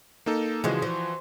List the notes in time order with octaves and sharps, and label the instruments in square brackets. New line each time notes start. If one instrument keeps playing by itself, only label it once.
[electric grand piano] A#3 D#4 A4
[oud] C#3 F3 G#3 [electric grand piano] E3 F#4
[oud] F3